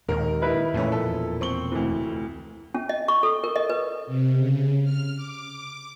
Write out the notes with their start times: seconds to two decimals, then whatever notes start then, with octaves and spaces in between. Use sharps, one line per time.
0.08 D#2 A#2 D#3 G#3 A#4
0.41 D#4 E4 B4
0.74 F2 A#2 E3 A3 C#4
0.92 E1 B2 F3 A4
1.41 C4 C#6 G7
1.72 F1 D2 E3
2.74 C#4
2.89 D#5
3.08 C#6
3.23 A4
3.44 A#4
3.56 D#5
3.70 B4
4.07 C3
4.38 C#3
4.83 F6
5.16 D6